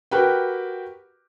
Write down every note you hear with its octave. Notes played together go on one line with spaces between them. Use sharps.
F#4 G4 A#4 B4 G5